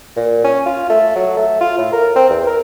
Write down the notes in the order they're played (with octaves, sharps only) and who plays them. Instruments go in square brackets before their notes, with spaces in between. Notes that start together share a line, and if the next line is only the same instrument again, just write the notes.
[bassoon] A#2
C#4
F4
A3
F#3
A3
F4
A2
A#4
C4
E2
A#4